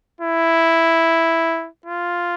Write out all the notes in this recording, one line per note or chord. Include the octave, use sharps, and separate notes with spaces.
E4
F4